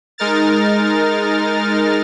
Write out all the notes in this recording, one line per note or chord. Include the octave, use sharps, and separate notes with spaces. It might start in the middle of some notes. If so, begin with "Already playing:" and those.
G#3 D#4 A#4 F6 A6